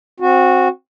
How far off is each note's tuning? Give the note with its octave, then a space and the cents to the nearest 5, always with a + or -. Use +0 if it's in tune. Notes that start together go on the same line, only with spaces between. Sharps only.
C4 +10 F#4 -15